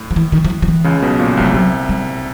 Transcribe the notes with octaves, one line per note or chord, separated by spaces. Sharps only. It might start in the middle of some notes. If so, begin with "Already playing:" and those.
Already playing: A2
F3
E3
D#3
F3
E3
F3
E3
C#2 C#3
B1 B2
A#2
C2 C3 G#3
G3
C2 C3 F#3
G3